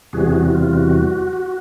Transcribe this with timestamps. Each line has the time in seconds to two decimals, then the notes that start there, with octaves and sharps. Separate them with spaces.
0.13 E2 C3 E3 G3 F#4 G#4
0.33 F#4
0.53 F4
0.73 F#4
1.33 F#4